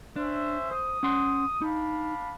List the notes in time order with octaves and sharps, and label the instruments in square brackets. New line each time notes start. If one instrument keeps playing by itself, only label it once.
[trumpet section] C#4 C5 E5 [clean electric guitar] D4
[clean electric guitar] C5 [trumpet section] D#6
[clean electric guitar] C#4 F#5 C6
[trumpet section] D4 F5 B5 [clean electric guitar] D#4